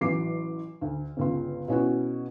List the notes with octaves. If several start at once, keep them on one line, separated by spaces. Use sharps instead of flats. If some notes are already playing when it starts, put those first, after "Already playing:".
A1 E3 F#3 D6 C7
D2
G1 C#2 C6
B2 C#4 E4 F#4